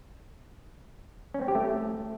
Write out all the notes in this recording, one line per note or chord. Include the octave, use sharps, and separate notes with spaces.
C#4
C4
G4
A3